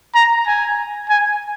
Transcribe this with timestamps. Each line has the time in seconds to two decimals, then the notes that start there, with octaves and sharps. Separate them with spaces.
0.15 A#5
0.47 G#5
1.10 G#5